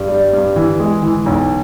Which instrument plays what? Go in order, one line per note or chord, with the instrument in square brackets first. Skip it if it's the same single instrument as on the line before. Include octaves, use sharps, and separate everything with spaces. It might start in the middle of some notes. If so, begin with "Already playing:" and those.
Already playing: [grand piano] G2
G3
G2
E3
G#3
E3
B1